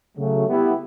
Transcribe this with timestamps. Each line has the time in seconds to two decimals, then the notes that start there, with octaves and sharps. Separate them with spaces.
0.17 C#3 F#3 A3
0.46 G3 B3 E4 G4